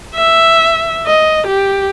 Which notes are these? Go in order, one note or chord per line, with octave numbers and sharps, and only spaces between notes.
E5
D#5
G4